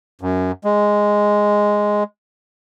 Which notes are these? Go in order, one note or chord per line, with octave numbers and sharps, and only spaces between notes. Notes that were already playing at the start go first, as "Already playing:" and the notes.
F#2
G#3